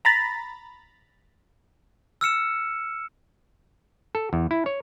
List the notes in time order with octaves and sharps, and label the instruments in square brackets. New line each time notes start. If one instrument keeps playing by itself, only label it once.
[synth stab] A#5 B5 A6
[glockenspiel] E6 F6 C#7 E7
[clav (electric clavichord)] A4
E2
E4
C#5